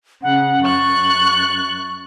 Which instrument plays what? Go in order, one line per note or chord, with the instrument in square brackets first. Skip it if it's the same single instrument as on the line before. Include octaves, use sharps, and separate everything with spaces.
[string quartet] C#3 [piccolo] F#5
[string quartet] F#2 F#6 A6 [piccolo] C#6